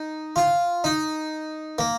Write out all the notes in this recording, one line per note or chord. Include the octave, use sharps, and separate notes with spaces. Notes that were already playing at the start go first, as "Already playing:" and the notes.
Already playing: D#4
F4
D#4
A#3